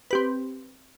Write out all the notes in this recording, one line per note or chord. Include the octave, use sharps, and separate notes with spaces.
C4 G4 B4